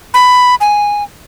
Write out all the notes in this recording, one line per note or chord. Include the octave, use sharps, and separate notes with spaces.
B5
G#5